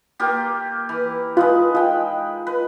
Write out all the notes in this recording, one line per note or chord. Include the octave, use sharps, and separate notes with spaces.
A#3 F4 G4
E3
G#3 D#4 F4 B4
G#3 F4 G5
B4